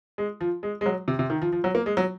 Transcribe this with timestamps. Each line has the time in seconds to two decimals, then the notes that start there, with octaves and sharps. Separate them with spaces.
0.18 G#3
0.41 F3
0.63 G#3
0.81 G#3
0.86 F#3
1.08 C3
1.19 C3
1.30 D#3
1.42 F3
1.52 F3
1.64 F#3
1.75 A#3
1.86 G#3
1.97 F#3